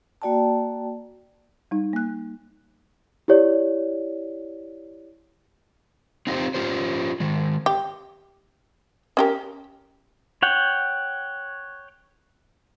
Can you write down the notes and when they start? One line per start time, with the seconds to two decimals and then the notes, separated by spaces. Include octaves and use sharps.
0.22 A#3 F#4 D5 G5 A5
1.71 G3 D#4
1.93 A#3 F#6
3.28 E4 G4 C#5 D5
6.27 C4 D#4 F4 G4 A#4 C5
6.54 C#4 F4 G4 C5
7.20 D#3 G#3
7.66 G4
9.17 C#4 G4 A#4
10.42 C#5 F#5 G5